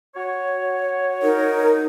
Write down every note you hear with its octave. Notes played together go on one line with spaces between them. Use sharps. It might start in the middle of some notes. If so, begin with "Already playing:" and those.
F#4 C#5
D#4 A#4